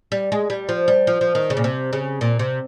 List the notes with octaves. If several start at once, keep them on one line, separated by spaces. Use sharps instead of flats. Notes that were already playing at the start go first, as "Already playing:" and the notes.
G3
G#3
G3
F3
G3
F3
F3
D#3
C#3
A#2
C3
C#3
A#2
C3